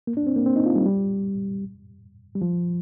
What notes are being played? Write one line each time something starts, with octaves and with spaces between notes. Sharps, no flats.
A#3
D4
C4
A#3
C4
D#4
F4
G3
G3
G3
F3